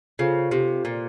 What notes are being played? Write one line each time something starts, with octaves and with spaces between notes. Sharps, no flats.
C#3 F4 A4 C5 F5
C3
A#2